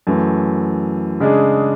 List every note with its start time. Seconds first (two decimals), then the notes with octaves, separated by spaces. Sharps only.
0.07 F#2 E3 A3
1.20 C#3 G#3 D4 G#4